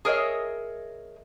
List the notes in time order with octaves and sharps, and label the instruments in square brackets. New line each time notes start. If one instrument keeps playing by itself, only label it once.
[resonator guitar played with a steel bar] G#4 A#4 C#5 D#5 E5